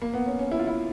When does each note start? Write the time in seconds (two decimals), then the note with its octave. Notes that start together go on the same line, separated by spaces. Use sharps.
0.02 A#3
0.14 B3
0.27 C#4
0.39 C#4
0.52 E4
0.59 F4
0.67 E4